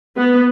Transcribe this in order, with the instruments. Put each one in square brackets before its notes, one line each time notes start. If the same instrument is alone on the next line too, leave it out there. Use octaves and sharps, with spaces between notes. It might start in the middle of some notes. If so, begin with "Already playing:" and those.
[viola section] B3